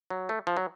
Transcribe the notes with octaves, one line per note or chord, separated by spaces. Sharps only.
F#3
A3
F3
F#3